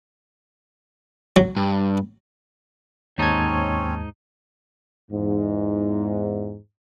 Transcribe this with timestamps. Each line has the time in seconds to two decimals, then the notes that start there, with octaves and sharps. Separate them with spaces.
1.36 F#3
1.57 G2
3.18 D#2 G#2 C4 C#4 D#4 C#5 A5 G#6
5.11 E2 G#2